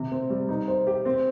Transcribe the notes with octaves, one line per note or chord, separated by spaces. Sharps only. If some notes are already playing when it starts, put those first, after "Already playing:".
Already playing: C3
C4
G3
D#4
C5
G4
C4